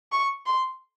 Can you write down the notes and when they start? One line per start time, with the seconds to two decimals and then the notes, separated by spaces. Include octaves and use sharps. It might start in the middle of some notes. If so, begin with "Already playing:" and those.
0.12 C#6
0.46 C6